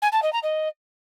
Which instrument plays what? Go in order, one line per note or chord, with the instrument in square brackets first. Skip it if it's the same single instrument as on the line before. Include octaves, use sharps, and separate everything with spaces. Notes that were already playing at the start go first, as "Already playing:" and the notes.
[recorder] G#5
A5
D#5
A#5
D#5